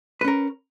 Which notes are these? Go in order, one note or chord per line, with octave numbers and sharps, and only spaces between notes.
C#4 A#4 B4